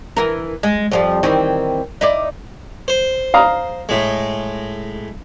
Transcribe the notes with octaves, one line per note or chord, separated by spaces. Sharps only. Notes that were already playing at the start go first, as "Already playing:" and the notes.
E3 A#4
G#3
F2 F3 G3
D#3 E3 C4
D#4 E4 D5
C5
F5 A#5 D#6
A2 G#3